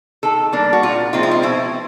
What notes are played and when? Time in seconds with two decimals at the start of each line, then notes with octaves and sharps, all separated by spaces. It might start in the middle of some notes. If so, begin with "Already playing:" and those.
0.23 D#3 A4
0.53 G3 A#3 D4
0.73 F#4
0.83 A#2 F4
1.13 F3 G#3 C4 D#4 F4
1.23 E4
1.31 F4
1.43 B2 E4